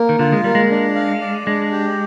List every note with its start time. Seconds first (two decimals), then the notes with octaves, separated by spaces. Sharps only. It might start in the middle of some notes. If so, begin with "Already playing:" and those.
Already playing: A#3
0.09 D#3
0.19 D3 F4
0.32 G#3
0.44 G3 A#3
0.55 G#3
0.70 D4
0.95 F5
1.21 D5
1.46 G#3 D4
1.72 G4